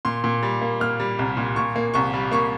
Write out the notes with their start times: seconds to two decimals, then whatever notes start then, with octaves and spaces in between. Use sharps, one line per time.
0.05 A#2 C6
0.24 A#2
0.43 G3
0.61 A#3
0.80 A#3 F6
1.00 G3
1.19 C2
1.37 A#2
1.56 A#2 C#6
1.76 A#3
1.94 C2 C#6
2.13 G3
2.31 A#3 C#6